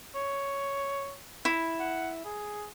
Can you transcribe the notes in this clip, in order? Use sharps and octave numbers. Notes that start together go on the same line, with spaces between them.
C#5
E4
F#5
G#4